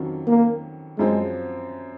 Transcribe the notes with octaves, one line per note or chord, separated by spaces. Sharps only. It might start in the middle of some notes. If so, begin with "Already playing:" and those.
Already playing: F2 D#3 F#3 C#4 F4
A#3
F#2 F3 G#3 C4 F4